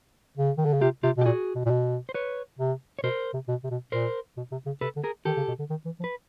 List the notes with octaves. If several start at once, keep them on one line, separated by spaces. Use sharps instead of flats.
C#3
D#3
D3
C#3
C3 F4 G4
C3 F4 G4
B2
G4
A#2 F#4 G#4
B2
A#2
B2
C5
B4 C#5
C3
C#5
B2 A#4 C5
C3
B2
C3
B2
A#2 A#4 C5
B2
C3
C#3
C3 A4 B4
D3
G#4 A#4
D#3 G4 A4
C#3
B2
D3
D#3
E3
F3
B4